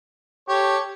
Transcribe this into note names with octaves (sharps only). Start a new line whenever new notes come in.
G4 A4 C#5